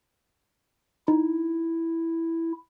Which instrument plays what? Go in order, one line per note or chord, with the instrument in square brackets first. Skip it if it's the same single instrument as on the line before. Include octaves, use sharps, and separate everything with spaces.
[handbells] D#4 [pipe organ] E4